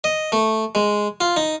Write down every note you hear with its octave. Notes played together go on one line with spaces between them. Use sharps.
D#5
A3
G#3
F4
D#4